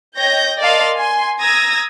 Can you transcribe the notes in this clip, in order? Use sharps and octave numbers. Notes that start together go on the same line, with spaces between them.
C#5 D#5 G5 G6 A#6
A#4 D5 D#5 F5 A5 C6
G#5 C6
A#5 D#6 E6 G#6 A#6